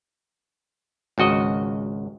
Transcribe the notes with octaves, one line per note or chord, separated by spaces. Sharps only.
G#1 C#2 F#4 D#5